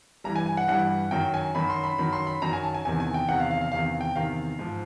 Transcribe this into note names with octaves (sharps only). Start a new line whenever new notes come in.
G2 E3 G3 A#5
G#5
G#5
F#5
G2 E3 G3 F#5
F#2 D#3 F#3 G5
G#5
F#2 D#3 F#3 B5
C6
B5
F#2 D#3 F#3 B5
C6
B5
F#2 D#3 F#3 A#5
G#5
A5
G#5
E2 C3 D#3 G#5
G#5
G5
E2 C3 D#3 F#5
F5
F5
F5
E2 C3 D#3 F5
G5
E2 C3 D#3 F5
G#2 F3